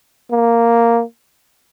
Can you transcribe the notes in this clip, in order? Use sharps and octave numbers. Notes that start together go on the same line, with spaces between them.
A#3